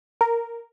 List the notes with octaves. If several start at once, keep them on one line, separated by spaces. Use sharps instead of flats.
A#4